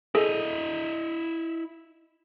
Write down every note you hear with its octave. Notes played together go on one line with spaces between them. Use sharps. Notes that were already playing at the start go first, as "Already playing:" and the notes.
E4 G#4 A4 D#5